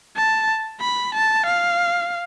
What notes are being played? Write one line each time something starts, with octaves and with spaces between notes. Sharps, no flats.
A5
B5
A5
F5